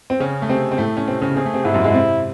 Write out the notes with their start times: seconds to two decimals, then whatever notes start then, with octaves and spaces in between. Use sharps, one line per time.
0.10 C4
0.20 C#3 C#4 G#4
0.42 A3
0.49 C3 C4
0.72 C4
0.78 A2 A3
0.97 C#4
1.08 C3 C4
1.22 C#3 C#4
1.36 C4 G#4
1.46 A3
1.54 C3 C4
1.65 G#2 G#3 E4
1.74 F#2 F#3
1.84 G#2 G#3
1.94 C3 C4